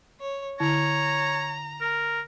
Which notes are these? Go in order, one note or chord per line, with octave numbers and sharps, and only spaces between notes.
C#5
D3 E4 C#5 A5 A#5
A#4